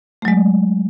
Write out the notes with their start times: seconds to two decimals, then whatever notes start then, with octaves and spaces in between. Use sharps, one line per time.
0.22 A3
0.25 F#3
0.28 G#3